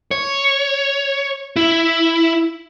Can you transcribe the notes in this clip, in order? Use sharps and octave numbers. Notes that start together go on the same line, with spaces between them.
C#5
E4